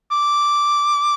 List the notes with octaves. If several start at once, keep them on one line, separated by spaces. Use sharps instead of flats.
D6